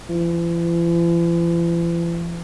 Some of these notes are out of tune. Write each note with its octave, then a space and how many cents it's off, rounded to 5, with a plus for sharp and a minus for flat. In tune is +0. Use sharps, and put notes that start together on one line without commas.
E3 +45